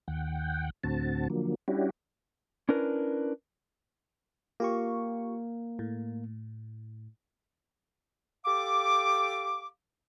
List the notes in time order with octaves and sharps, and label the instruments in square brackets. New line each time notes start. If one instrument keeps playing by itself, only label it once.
[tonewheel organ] D#2 F#5 G5
D2 A2 D3 C4 F#4 A5
D3 F3 F#3 A#3
G3 C#4 D4 E4 F#4 G4
[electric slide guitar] C#4 D4 E4 A#4 B4
[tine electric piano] A#3 [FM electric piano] F4 G4 C#6
[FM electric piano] A2
[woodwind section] G4 A4 F5 D6